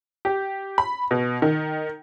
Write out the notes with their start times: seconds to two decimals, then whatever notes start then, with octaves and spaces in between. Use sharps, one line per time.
0.25 G4
0.78 B5
1.11 B2
1.42 D#3